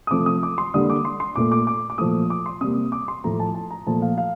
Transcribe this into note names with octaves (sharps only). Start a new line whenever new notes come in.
D#6
C3 F3 A3 D6
D#6
D6
C6
D3 G3 A#3 D#6
D6
C6
C6
A#2 A3 D6
D6
D6
D6
A#2 F3 A3 D#6
D6
C6
C3 G3 A#3 D#6
D6
C6
A2 F3 A3 A#5
A5
A5
A#5
A#2 F3 A3 A5
F5
F5